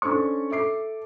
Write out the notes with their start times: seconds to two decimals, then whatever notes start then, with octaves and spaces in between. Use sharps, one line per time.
0.02 C#4 D4 A4 C5 C#6
0.50 A4 E5 D6 C7